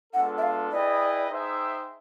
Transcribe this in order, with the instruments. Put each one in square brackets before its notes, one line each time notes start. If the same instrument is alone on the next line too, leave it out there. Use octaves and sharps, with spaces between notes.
[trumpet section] G#3 B3 D4 F4 A4 [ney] F#5
[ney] E5
F5
[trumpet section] E4 G#4 B4 D#5 G5 [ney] D5
[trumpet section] D#4 G#4 C5 E5 G5